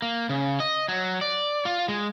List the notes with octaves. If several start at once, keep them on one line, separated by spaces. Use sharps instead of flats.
A#3
C#3
D#5
F#3
D5
F4
G#3